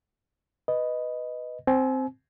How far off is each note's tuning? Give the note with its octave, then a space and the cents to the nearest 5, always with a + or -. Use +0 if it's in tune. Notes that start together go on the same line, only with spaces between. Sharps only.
B4 +5 D#5 +0
C4 +0 G#5 +35